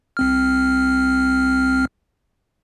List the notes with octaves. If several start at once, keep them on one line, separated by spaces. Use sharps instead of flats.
C2 C4 F6